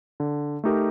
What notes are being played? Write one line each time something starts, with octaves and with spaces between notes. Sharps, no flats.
D3
A3 D#4 G4 A#4